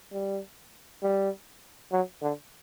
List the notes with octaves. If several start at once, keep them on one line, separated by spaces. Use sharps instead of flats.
G3
G3
F#3
D3